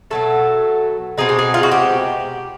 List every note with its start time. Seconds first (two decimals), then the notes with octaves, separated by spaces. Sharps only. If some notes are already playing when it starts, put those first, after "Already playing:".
0.11 B2 F#3 A3 A4
1.18 B2 G#3 C4 D#4 G#4
1.29 G4
1.39 G#4
1.54 F4
1.63 F#4
1.71 G4